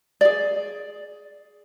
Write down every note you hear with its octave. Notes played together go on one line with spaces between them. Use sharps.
G#4 D5